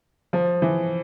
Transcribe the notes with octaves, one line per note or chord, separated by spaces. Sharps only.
F3
E3